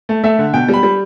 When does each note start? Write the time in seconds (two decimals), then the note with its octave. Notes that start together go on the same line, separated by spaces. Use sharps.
0.09 A3
0.24 A3 E5
0.39 D3
0.53 B2 G5
0.69 G3
0.74 B5
0.83 G3